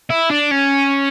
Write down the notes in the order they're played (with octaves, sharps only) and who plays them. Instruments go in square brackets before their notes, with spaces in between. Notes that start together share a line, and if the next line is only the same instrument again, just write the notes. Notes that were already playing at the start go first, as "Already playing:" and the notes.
[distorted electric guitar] E4
D4
C#4